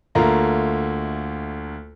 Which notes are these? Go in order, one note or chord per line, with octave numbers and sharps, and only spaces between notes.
D2 A3 A#3 F4 A#5